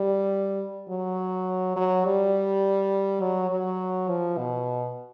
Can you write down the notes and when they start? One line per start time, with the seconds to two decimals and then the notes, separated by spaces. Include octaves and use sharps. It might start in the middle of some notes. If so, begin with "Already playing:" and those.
Already playing: G3
0.89 F#3
1.77 F#3
2.05 G3
3.21 F#3
3.50 F#3
4.09 F3
4.38 B2